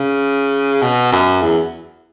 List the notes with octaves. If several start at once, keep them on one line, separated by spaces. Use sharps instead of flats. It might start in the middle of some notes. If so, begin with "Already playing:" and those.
Already playing: C#3
B2
F#2
E2